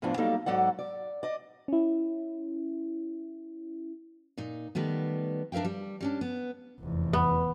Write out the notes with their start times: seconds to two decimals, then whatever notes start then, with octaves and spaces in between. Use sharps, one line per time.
0.02 E2 A2 E3 F3 D4 F4
0.17 F#3 G3 A#3 D#4 A4 F5
0.46 G#2 F#3 A4 D5 F#5
0.79 D5
1.23 D5 D#5
1.68 C#4 E4
4.38 A#2 D#4
4.75 D#3 G3 A3 B3
5.52 D4 A#4 E5 F5 G5
5.65 G3
6.01 G3 C#4 D4
6.21 B3
6.80 F1 E2
7.13 B3